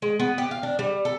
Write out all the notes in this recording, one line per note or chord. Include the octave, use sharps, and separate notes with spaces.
G#3
B3
G4
F5
D4
G3
A4